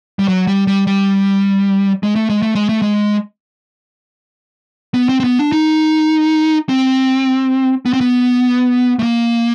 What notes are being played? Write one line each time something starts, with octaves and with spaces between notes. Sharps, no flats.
G3
F#3
G3
G3
G3
G#3
A3
G#3
A3
G#3
A3
G#3
B3
C4
C4
B3
D4
D#4
C4
B3
C4
B3
A3
A#3